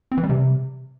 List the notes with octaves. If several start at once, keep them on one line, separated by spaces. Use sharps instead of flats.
C4
E3
G3
C3